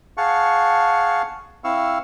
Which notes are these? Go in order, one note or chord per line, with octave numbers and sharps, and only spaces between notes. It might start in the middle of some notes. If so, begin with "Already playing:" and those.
G#4 F5 F#5 A5 C#6
C4 E4 F5 C#6 E6